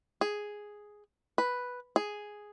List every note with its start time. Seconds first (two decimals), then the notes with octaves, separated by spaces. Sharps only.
0.21 G#4
1.38 B4
1.96 G#4